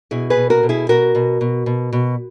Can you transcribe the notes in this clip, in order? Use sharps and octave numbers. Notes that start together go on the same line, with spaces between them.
B2 E4 G#4
G#4 B4
B2
F#4 A#4
B2
E4 G#4
B2 F#4 A#4
B2
B2
B2
B2